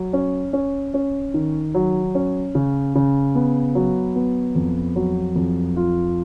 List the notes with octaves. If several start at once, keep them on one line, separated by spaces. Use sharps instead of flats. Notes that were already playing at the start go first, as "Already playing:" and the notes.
Already playing: F#3
C#4
C#4
C#4
D#3
F#3
C#4
C#3
C#3
B3
F#3
B3
F2
F#3
F2
F4